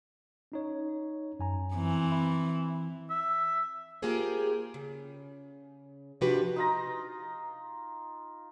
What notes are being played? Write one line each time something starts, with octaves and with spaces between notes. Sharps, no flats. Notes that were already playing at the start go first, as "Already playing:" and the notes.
C#4 D#4 C#5
F#2 G#5 A#5
E3 C4
E5 B5
E5
A#3 F4 G4 G#4 C5
C#3
C3 F3 D4 F#4 G4 B4
D#4 F4 A#5